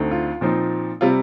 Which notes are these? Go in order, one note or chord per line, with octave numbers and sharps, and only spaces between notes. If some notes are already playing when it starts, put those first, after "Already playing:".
Already playing: D2 D3 A3 C4 D#4
F4
A#2 F3 C4 D#4
C3 G3 C4 F4